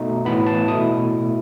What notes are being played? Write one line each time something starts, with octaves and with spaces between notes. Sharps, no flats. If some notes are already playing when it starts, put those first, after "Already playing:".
Already playing: B2 A3 D#4
A2 E3 B3 B5
A5
B2 A3 E4 D#6